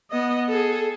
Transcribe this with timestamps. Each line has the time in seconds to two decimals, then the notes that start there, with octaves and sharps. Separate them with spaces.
0.11 B3 D#5
0.49 G#4 A4